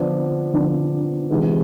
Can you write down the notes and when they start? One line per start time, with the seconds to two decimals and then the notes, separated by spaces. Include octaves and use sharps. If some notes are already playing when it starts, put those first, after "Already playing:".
Already playing: D3 F3 B3 D4
0.53 D3 F3 B3 D4
1.30 C3 E3 G#3 B3